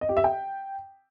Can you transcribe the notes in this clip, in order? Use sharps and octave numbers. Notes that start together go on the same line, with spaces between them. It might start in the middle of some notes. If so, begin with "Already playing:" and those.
D#5
G4
E5
G5